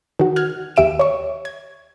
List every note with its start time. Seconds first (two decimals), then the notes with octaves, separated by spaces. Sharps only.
0.19 D#3 F#4
0.36 F6 F#6 G#6
0.76 D#2 G4 E5 D7 E7
0.99 C#5 C#6
1.45 G#6